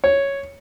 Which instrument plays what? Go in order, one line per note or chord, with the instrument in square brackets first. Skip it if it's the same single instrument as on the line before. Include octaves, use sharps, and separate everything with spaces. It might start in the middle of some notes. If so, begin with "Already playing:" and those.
[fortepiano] C#5